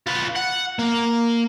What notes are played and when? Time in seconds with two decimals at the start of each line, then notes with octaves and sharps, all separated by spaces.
0.07 F4 B4
0.36 F#5
0.79 A#3